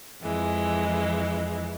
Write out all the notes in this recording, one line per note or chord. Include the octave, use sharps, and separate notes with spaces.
F2 E3 G#3